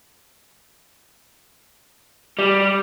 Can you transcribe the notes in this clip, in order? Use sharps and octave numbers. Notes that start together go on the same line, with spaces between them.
G3